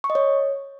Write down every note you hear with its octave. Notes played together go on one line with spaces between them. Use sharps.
C#6
D#5
C#5